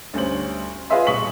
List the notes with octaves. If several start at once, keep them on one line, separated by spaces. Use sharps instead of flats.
D2 G2 C#4 C5 F#7
F4 G#4 B4 D#5 E5 C6
D#1 B2 C#6 B6 F#7